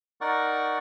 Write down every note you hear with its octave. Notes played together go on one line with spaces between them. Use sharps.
D#4 A#4 D5 F#5 C#6